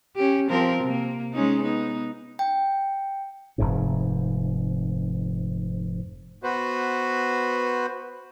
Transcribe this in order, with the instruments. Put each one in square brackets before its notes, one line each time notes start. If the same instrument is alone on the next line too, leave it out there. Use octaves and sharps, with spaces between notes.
[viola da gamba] C#4 G4
F3 C4 A#4
C3 A#3
G#3 C#4 D#4
B3 D#4
[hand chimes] G5
[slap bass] F1 G#2 C3
[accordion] B3 F#4 B4 C5